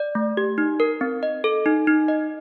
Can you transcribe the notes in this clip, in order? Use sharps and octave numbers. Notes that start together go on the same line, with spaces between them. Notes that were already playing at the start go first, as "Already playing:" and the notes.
Already playing: D5
A3
G4
D#4
A#4
C4
D#5
A4
D#4
D#4
D#5